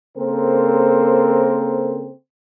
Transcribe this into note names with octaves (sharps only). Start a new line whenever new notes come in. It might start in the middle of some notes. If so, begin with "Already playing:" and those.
C#3 A#3 C4 A4 A#4 C5